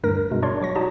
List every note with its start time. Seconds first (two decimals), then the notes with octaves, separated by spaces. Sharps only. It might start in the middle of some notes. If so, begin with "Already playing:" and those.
0.04 D2 G2 A#4 A#6
0.31 G2 B2 G#3
0.42 D4 C#5 D5 C6
0.61 F#3 C#6 A#6
0.75 D#4 F#4 D5 D#5 A5